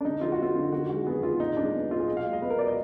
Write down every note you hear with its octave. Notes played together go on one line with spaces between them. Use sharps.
D4
D3 D#4
F3 F4
F#4
B3 F4
D3
D#3 F#4
G#3 F#4
B3 G#4
D#3 F4
A#2 D#4
G#3 D4
B3
A#2 F4
G#4
B2 D#5
F5
G#3
D#5
B3 B4
A#4
B2 D5
D#5